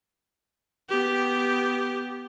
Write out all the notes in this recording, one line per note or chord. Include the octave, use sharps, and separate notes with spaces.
B3 G4